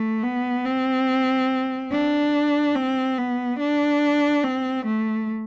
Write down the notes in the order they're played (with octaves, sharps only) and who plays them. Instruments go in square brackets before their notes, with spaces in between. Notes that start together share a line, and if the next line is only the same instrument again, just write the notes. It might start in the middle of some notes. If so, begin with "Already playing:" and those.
Already playing: [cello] A3
B3
C4
D4
C4
B3
D4
C4
A3